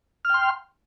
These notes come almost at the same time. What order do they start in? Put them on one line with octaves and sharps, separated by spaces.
F6 G5 C6